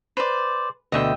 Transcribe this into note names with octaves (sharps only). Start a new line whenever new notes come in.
B4 C5 D5
D2 B2 D3 D#5 E5 G5